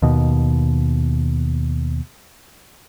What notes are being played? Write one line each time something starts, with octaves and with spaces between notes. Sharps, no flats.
D#2 B2